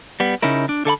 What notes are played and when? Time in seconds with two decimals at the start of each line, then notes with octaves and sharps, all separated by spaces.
0.20 G3 B3
0.42 C#3 C#4 D#4 E4 A#4
0.69 D4
0.85 D3 A4 E5 B5